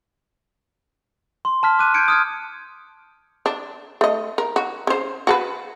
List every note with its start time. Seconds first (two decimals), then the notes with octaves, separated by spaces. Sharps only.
1.45 C6
1.63 A5 F6 B6
1.79 D6 F6 F#6 D#7
1.94 F6 G6 G#6 C#7 D7
2.08 D#6 F6 G#6
3.46 D4
4.01 A3 D#5
4.38 A#4
4.56 F#4
4.87 C#3 C5
5.27 F#4 A4 B4